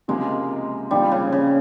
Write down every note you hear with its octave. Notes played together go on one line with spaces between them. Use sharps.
C#2 C3 F3 G#3 A#3
A#2 F3 G3 C4 D#4
C#3
C#3